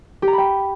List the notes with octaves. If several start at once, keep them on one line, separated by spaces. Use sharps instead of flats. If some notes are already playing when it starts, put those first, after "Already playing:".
G4
A#5
B5
G5